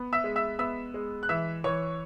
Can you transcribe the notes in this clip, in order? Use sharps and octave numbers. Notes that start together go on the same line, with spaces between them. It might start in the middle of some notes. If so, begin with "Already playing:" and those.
Already playing: B3
E5 E6
G#3
E5 E6
B3 E5 E6
G#3
F#6
E3 E5 E6
E3 C#5 C#6